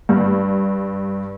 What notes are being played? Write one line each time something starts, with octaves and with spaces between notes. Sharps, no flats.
G2